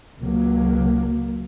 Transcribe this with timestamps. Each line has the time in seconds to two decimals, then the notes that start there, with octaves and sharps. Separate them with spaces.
0.21 C#2 F#3 A#3